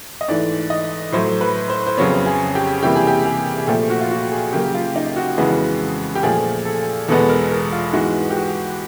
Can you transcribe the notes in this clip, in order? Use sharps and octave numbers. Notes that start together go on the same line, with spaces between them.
D#5
G#2 E3 A3 D5
D#5
A2 F#3 A3 C5
B4
C5
C5
F2 C#3 F#3 B3 C#5
G#4
G4
C3 E3 G3 A#3 G4
G#4
G4
G#4
G#4
A#2 F3 A3 G4
F#4
F4
F#4
G#4
C#3 F#3 A#3 G4
F4
D#4
F#4
F2 C#3 E3 G#3 B3
G4
A#2 F3 A3 G#4
A4
E2 B2 G#3 B3 A4
A#4
A#4
F4
G#2 E3 G#3 B3 F#4
G4
F#4